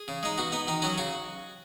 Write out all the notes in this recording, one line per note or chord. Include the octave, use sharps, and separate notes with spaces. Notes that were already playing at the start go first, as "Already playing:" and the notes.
Already playing: G#4
C#3
G#3 D#4
B2 F#4
B3 D#4
D#3 D#4
F#3 C#4 F#4
C#3 F#4